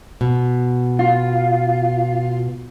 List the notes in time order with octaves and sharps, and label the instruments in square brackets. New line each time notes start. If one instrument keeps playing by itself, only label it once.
[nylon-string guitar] B2
[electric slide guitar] F4